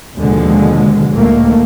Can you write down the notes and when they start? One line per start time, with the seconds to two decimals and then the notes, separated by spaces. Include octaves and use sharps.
0.15 D#2 B2 D3 F3 G#3
1.10 D2 A#2 D#3 A3 A#3